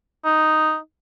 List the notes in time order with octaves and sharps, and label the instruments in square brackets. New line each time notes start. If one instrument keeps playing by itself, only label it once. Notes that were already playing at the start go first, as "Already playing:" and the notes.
[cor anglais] D#4